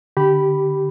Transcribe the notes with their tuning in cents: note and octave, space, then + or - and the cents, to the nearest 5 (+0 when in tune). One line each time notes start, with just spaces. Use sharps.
D3 +0 G4 -15 B5 +0